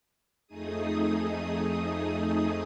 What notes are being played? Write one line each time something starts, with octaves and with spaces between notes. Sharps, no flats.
F2 A3 D#4 G#4 D#6